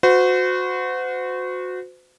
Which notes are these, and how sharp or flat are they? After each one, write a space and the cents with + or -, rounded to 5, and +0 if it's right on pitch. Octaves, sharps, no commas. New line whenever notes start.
F#4 -20 C5 -40